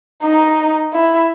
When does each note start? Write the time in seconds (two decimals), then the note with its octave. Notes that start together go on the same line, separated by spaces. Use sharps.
0.23 D#4
0.93 E4